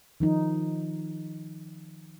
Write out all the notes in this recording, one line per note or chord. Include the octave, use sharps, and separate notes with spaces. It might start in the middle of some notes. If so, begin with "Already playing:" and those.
D#3 F3 D#4